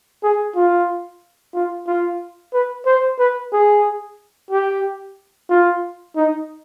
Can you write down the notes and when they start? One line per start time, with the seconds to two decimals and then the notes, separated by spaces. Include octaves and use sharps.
0.23 G#4
0.56 F4
1.55 F4
1.87 F4
2.54 B4
2.86 C5
3.19 B4
3.52 G#4
4.51 G4
5.50 F4
6.16 D#4